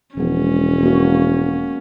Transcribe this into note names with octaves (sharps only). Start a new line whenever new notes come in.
E1 F3 G#3 B3 C#4
A#3 F#4